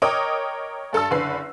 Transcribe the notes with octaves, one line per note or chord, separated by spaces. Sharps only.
A#4 C#5 D#5 G5 D6 D#6
G2 A4 A5 E6
F#1 D3 B4 C7